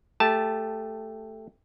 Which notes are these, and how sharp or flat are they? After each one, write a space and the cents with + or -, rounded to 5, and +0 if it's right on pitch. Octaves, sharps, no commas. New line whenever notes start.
A3 +0 G4 +10 A5 -5